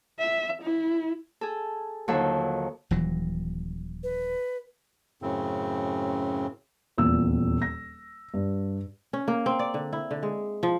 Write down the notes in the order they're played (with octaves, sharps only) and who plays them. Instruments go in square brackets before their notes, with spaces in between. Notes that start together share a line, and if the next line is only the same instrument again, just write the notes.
[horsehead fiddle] E5
E4
[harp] G#4 A4
D#2 D3 F3 F#3 A4
[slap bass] D#1 E3 F#3
[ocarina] B4
[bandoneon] F#2 A2 C#3 C4
[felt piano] D#1 E2 A#2 E6
A#6
G2
[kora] C#4
A#3
C4
D5
D3
E4
D3
G#3
F3